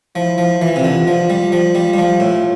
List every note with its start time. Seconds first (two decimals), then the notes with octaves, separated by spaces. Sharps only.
0.15 F3 E4
0.38 F3
0.62 E3 F4
0.76 C3
0.84 D3
1.06 F3 F4
1.30 G3
1.52 F3
1.75 G3
1.93 G3
1.98 F3
2.20 A2